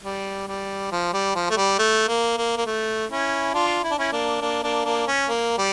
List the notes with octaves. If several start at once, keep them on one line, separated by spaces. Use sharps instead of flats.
G3
G3
F3
G3
F3
A3
G3
A3
A#3
A#3
A#3
A3
C#4 E4
D4 F4
E4
D4
C#4 E4
A#3 D4
A#3 D4
A#3 D4
A#3 D4
C#4
A#3
G3